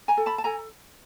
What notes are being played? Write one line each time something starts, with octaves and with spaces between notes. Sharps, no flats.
G#5 A#5
A4
A5 B5
A5
A4 G#5 A#5